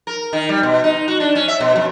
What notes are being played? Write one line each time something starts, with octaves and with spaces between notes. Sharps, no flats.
A#4
D#3
G3
B2
D#4
F#4
D4
C#4
E5
B2
F#2